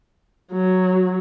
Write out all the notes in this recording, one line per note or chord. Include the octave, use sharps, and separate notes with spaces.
F#3